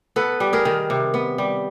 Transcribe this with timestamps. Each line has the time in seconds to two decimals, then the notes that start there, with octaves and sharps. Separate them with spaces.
0.16 B3 A4 B4
0.40 G3
0.53 G#4 A#4
0.65 D#3
0.90 C3
1.14 B3
1.38 G3